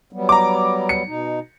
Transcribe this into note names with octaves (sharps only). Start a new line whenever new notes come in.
F#3 G3 B3
A#5 D6
C#7
B2 D#4